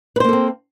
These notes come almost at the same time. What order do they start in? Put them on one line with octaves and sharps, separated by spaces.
B4 C5 A#3 A4 C4